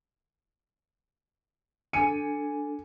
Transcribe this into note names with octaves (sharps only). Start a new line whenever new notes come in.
D4 A4 G#5 C#7 D#7